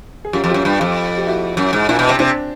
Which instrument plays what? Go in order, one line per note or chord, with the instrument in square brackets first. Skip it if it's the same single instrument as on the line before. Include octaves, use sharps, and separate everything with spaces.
[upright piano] G#4
[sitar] F#2 [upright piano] F4 G4
[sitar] F2
[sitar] F#2 [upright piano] F4 G4
[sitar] G2
F2
[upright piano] G4
E4 F#4
[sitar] F#2
G#2
[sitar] A#2 [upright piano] D4 E4
[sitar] B2
C3
[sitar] C3 [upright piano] C4 D4